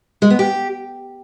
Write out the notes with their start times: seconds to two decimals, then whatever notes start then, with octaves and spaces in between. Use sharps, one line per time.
0.22 G#3
0.30 B3
0.39 G4